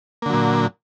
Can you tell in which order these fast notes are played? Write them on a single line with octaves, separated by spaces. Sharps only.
A#3 D3 F#3 A#2